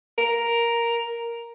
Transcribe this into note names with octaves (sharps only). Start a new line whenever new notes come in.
A#4